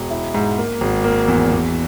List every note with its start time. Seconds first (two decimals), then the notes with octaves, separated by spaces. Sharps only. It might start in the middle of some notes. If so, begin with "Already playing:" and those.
Already playing: E1
0.11 E4
0.34 G#2
0.58 A#3
0.81 G#1
1.04 A#3
1.28 E2
1.52 E2